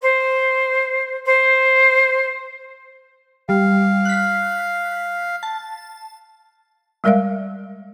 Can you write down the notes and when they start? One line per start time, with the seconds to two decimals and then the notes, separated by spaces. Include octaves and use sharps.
0.02 C5
1.25 C5
3.49 G3 F5
4.05 F#6 B6
5.43 A5
7.04 G3 G#3 A#4 D5 E5 F5